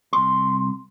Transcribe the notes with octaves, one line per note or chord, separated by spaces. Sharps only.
C2 C6